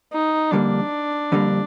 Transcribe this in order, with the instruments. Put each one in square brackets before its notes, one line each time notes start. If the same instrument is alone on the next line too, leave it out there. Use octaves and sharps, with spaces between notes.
[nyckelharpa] D#4
[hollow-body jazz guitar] F2 D3 G3 A#3 [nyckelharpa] D4
[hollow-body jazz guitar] F2 D3 G3 A#3